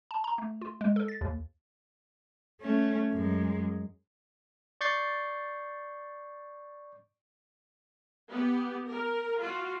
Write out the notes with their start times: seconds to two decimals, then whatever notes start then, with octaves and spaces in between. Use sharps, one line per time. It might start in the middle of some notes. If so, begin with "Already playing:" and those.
0.11 A5
0.24 A#5
0.38 A3
0.61 F4
0.81 G#3
0.96 A4
1.08 A6
1.21 D#2
2.61 A3 C#4
3.12 F#2 G#3
4.81 D5 C#6 G6 A6 C7
8.30 B3 G4
8.89 A#4
9.39 F4 F#4